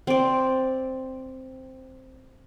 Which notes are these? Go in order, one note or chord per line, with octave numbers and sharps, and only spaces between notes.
C4 D5